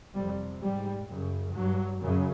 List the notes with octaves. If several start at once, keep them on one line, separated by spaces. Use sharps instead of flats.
F2 C3 G3
G#2 G3
F#2 C#3
G2 F#3
F#2 C#3